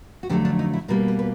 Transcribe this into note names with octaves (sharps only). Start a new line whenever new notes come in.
F#4
F2 D3 F#3 A3 G4
D4
D#4
E4
B2 G3 A#3 A#4
B4
B4